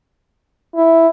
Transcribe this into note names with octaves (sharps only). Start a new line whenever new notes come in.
E4